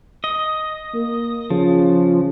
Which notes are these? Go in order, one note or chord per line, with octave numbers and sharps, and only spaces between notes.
D#5
A#3
C#3 F3